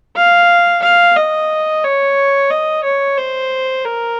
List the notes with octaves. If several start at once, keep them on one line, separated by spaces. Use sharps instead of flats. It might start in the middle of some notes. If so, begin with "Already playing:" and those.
F5
F5
D#5
C#5
D#5
C#5
C5
A#4